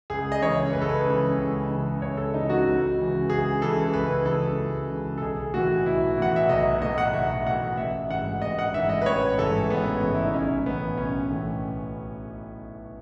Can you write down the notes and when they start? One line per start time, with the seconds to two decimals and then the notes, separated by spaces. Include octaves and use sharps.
0.10 C#2 G#4
0.32 D#5
0.42 C#3 E3 C#5
0.73 C#2 B4
0.82 A4
0.89 B4
1.05 C#3 E3
1.38 C#2
1.69 C#3 E3
2.01 C#2 C#5
2.17 A4
2.34 C#3 E3 D#4
2.50 F#4
2.66 C#2
2.98 C#3 E3
3.30 C#2 G#4
3.62 C#3 E3 A4
3.94 C#2 B4
4.25 C#3 E3 A4
4.58 C#2
4.90 C#3 E3
5.18 A4
5.21 B1 G#4
5.53 A2 E3 F#4
5.86 B1 E4
6.18 A2 E3 F#5
6.36 E5
6.49 B1 D#5
6.82 A2 E3 D#5
6.98 F#5
7.14 B1 E5
7.46 A2 E3 F#5
7.77 A1 E5
8.10 G#2 E3 F#5
8.42 A1 D#5
8.59 F#5
8.74 G#2 E3 E5
8.89 D#5
9.02 B4
9.06 A1 C#5
9.38 G#2 E3 A4
9.70 A1 B3
10.02 G#2 E3
10.15 E4
10.25 D#4
10.33 B1 C#4
10.66 A2 E3 B3
10.97 B1 C#4
11.30 A2 E3